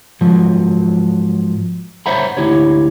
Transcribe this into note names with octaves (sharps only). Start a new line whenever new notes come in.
G#2 F3 F#3
C5 C#5 E5 F#5 A#5 B5
D2 E4 G4 C#5